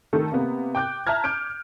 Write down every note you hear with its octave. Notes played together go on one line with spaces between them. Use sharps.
D#3 A3 A4
C3 A#3 B3
G5 D6 F#6 G6
E5 A5 A#5 F6 G#6
D6 F6 G6 D7